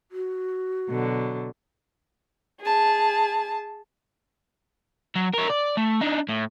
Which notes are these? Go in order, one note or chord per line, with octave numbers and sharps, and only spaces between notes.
F#4
B2 D3 F#3
G#4 A5
F#3
A#4 C#5
D5
A3
D4 D#4
A2